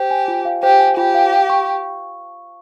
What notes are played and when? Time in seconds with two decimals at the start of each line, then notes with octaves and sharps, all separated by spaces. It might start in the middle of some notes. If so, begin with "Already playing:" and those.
Already playing: G4 C5
0.11 G#5
0.28 F4
0.45 F5
0.63 G4 C5
0.80 G#5
0.97 F4 G4
1.14 F5
1.32 F5
1.50 C#6